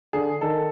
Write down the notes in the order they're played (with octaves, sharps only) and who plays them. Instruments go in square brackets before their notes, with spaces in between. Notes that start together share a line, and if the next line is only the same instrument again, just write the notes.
[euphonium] D3 [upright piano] G#4
[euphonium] D#3 [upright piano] A4